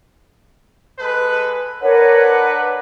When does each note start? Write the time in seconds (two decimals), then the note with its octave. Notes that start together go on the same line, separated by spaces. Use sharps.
0.98 G#3 A4 B4
1.82 D4 A#4 B4 C#5 F#5